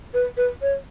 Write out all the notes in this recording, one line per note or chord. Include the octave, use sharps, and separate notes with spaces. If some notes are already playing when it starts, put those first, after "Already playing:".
B4
B4
C#5